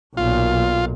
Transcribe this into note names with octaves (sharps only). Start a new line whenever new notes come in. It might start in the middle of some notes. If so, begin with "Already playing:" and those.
B1 A#2 F4